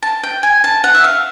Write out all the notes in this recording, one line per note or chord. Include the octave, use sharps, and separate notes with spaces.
A5
G5
G#5
A5
F#5
E5
F5